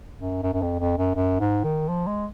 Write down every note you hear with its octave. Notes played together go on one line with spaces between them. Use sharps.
F#2
F#2
F#2
F2
F2
F#2
F#2
G#2
D#3
F3
G#3